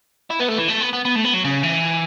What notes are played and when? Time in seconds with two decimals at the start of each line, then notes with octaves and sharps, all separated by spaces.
0.30 E4
0.40 B3
0.48 A3
0.58 E3
0.68 A3
0.81 B3
0.93 B3
1.05 B3
1.15 A3
1.24 B3
1.34 F#3
1.44 C#3
1.63 E3